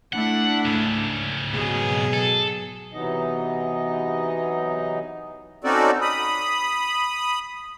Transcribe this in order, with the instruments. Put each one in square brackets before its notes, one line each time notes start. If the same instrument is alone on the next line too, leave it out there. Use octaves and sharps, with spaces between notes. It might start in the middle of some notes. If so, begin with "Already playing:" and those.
[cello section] A3 D4 E4 [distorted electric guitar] F#5
[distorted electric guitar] G#2 C#3
[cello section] B2 F#3 G#4
[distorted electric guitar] A4
[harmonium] C3 E3 F#3 B3 D#4 D#5
[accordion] C4 C#4 D#4 F#4 A4 D5
B5 D#6